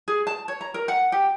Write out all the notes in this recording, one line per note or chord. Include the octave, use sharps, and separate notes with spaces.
G#4
A5
C#5
A#5
A#4
F#5
G4